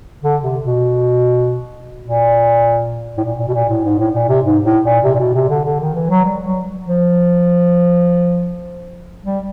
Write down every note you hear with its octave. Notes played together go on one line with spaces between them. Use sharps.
D3
C3
B2
A#2
A2
A#2
A#2
B2
A#2
A2
G#2
A2
A#2
C3
G#2
A2
A#2
C3
A#2
B2
C3
D3
D3
D#3
E3
F#3
G3
F#3
F3
G3